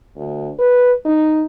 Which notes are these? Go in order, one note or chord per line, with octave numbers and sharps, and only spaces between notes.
D2
B4
D#4